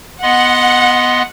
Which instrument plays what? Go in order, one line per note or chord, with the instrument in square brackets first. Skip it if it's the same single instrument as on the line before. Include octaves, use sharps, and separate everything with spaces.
[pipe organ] B3 D#5 C6 [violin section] F#5